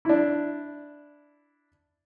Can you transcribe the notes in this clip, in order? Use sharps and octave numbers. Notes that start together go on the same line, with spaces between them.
D4 E4